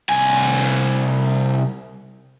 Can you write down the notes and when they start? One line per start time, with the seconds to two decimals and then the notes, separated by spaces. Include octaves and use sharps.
0.09 C2 G#5